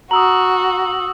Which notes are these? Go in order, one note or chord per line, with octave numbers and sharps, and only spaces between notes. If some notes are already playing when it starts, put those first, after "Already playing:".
F#4 A#5 D#6 E6 F#7